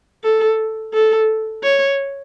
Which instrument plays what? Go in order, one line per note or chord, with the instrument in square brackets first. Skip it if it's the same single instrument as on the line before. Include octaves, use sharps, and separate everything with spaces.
[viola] A4
A4
C#5